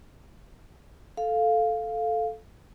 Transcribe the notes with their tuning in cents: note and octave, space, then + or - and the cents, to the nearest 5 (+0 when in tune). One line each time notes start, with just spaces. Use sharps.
A4 -5 F5 +0